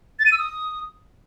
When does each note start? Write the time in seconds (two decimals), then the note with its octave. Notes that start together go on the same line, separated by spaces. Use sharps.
0.19 A6
0.26 D#7
0.32 E6
0.38 D#6